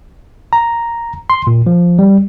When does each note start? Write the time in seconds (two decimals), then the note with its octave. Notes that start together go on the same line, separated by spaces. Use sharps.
0.53 A#5
1.30 C6
1.47 A#2
1.66 F3
1.99 G3